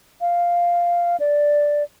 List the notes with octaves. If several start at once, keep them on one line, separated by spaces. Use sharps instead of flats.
F5
D5